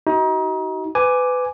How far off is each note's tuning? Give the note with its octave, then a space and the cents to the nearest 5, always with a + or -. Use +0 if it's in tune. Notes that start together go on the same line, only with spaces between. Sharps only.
D#4 +30 F#4 +30
B4 +25 G#5 +0 D6 +0